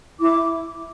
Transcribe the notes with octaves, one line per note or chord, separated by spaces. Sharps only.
E4 D6